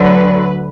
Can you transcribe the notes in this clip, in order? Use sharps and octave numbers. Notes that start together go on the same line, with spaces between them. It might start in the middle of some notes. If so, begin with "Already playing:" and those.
Already playing: D2 D3 F#3 B4